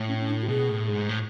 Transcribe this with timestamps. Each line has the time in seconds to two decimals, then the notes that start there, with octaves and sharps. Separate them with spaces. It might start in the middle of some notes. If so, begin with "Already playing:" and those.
Already playing: A2
0.08 C#4
0.19 C#4
0.29 D4
0.42 F#4
0.49 B2 G#4
0.69 A2
0.89 G#2
1.09 A2